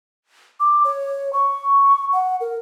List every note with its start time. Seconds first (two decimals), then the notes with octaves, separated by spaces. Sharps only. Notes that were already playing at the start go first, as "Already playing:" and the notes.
0.60 D6
0.85 C#5
1.33 C#6
2.13 F#5
2.41 A#4